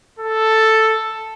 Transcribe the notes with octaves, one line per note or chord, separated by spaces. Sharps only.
A4